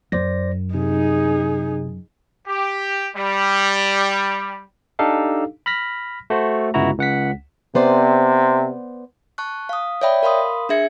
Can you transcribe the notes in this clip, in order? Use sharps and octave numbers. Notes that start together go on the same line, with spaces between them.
F#2 C5 D5 A#6
C3 D#4 G#4
G4
G3
D4 D#4 G4 A4 F5
B5 F6 A#6 B6
A3 F#4 C5
G1 C#2 E4 F#4 A#5
C#2 F#5 B6
C3 B3 C5 D5
A5 C#6 F#6
F5 D#6
C#5 D5 E5 G5 B5
A#4 F5 B5 C6 D#6
D4 G#4 E5 G#6 C#7